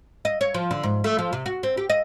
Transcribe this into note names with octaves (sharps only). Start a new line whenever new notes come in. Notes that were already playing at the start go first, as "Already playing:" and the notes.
D#5
C#5
F3
D3
G#2
A3
F3
C3
F#4
C4
G4
D#5